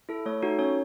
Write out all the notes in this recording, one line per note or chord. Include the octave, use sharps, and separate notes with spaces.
E4 A4
A3 C#5
D#4 F#4 A4
C#4 C#5